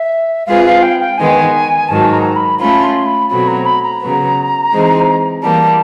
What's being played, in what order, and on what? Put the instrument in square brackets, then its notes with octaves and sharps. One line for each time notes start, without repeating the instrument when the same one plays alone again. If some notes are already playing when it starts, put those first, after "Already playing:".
Already playing: [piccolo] E5
[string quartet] G#3 C4 F4 G#4 B4 [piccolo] F5
[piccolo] F5
G5
G5
[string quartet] D#3 G#3 B3 [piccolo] G#5
[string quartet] G#2 D#3 F#3 [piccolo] A5
[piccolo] A#5
B5
[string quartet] A3 C#4 F4 [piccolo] B5
[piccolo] C6
B5
[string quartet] B2 F#3 A3 C4 [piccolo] B5
[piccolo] A#5
B5
A#5
[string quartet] C#3 F#3 B3
E3 G#3 C4 D#4
[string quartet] E3 G3 A#3 [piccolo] A5